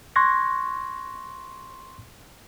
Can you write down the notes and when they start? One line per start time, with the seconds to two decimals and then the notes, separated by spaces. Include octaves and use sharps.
0.16 C6 C#6 F#6 G#6 A#6